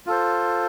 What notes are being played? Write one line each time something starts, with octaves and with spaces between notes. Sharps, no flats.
F4 A4 C5